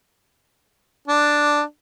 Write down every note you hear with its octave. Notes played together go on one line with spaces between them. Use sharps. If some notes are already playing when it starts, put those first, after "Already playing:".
D4